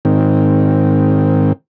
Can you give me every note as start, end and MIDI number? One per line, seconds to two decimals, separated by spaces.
0.05 1.52 44
0.05 1.52 51
0.05 1.52 60